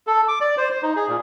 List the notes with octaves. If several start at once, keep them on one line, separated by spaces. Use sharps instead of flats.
A4
D6
D5
C5
C5
D#4
G#4
A#2